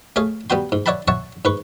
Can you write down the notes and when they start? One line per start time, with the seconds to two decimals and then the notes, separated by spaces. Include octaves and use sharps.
0.16 A3 G#4 C#5 F5
0.50 G3 B3 F#4 G5 C6
0.72 G#2
0.86 C#5 D5 E5 F#5 A5 B5
1.08 C#5 E5 F#5 A5 C#6
1.45 G#2 B4 C#6